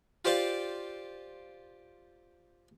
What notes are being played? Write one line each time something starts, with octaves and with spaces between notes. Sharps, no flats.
F4 G4 C5 D5 F5